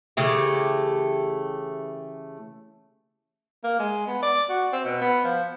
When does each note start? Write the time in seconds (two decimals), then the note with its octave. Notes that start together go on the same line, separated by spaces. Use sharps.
0.17 C#3 E3 A3 G4
3.64 A#3
3.79 G#3
4.07 B3
4.23 D5
4.50 F#4
4.73 C4
4.85 B2
5.01 B3
5.24 F3